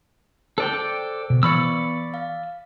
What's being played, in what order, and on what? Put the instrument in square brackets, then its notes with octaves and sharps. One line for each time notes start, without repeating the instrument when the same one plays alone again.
[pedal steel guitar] A4 D5 G5 [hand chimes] C5
[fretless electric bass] B2
[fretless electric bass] E3 [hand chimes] B3 C#6 C#7 [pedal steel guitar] D5 B5 E6
[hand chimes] F5